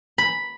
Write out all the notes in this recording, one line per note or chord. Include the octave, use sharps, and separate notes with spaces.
B5